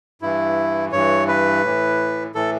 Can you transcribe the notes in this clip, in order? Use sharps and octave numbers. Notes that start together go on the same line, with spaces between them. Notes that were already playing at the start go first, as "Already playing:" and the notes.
G2 E3 E4
G2 E3 C#5
B4
A2 E3
A2 E3 A4